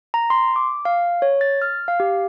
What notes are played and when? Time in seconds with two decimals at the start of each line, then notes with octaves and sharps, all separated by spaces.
0.14 A#5
0.30 C6
0.56 D6
0.85 F5
1.22 C#5
1.41 A6
1.62 F6
1.88 F5
2.00 G4